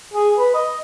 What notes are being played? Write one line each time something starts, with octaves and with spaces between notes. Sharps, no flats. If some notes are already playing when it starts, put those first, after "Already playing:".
G#4
B4
D#5